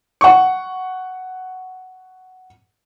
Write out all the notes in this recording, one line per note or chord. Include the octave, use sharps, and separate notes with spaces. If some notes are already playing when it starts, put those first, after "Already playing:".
F#5 C#6